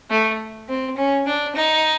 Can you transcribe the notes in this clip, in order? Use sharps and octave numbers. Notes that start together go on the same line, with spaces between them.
A3
C4
C#4
D4
D#4